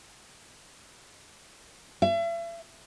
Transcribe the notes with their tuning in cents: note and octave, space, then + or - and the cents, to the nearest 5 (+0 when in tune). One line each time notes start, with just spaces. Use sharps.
E5 +40